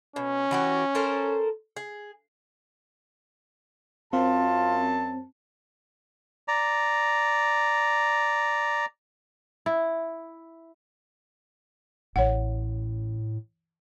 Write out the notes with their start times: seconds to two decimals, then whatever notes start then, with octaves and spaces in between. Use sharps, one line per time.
0.16 B2 C#4
0.51 E3 F#4 G4
0.95 A4 A#4 C5
1.76 G#4
4.13 F#2 C4 F4 A5
6.48 D5 A#5
9.66 E4
12.16 A1 A2 C#5 F#5